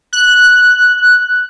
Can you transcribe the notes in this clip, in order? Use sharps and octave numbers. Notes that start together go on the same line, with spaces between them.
F#6